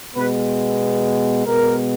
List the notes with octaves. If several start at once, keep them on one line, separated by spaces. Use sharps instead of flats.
B2 G#3 B3 B4
B2 G#3 B3 A#4